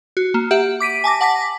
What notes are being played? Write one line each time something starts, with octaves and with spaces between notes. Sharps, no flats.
F#4
A#3
G4 E5 F#5
D6 B6 D7 D#7
G#5 A5 D6 A#6
F#5 A5 D6 A#6 B6